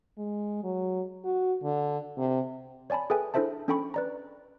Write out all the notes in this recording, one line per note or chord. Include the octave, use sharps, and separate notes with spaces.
G#3
F#3
F#4
D3
C3
C#5 D5 G#5 A5 B5
G#4 A4 B4 E5 G5 G#5
D4 E4 A4 C5 E5 A5
C#4 D4 A4 G5 B5 C#6
B4 D5 A#5